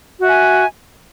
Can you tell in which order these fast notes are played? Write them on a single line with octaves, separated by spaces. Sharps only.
F#4 E5 G#5